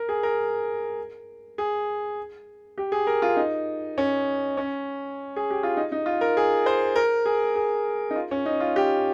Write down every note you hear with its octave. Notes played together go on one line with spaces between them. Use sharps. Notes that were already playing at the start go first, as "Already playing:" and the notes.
Already playing: A#4
G#4
A#4
G#4
G4
G#4
A#4
F4
D#4
C#4
C#4
G#4
G4
F4
D#4
D#4
F4
A#4
G#4
C5
A#4
G#4
G#4
D#4
F4
C#4
D#4
F4
G4